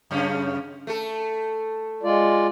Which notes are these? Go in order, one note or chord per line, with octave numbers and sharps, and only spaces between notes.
F#2 C#3 C#4
A3 A4
G#3 F4 D5